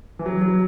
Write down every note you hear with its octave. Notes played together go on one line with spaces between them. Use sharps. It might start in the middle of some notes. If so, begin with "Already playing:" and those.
E3
F#3
F#3